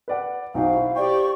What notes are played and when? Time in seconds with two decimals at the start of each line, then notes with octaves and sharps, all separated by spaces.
0.08 B4 D5 F#5
0.54 B1 C4 D#4 F#4 F5 D6
0.75 E4 F#4
0.95 C4 G4 D5 E5 F5 G5 C#6